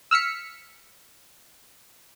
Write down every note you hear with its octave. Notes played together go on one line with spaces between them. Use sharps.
E6 F6 B6 C#7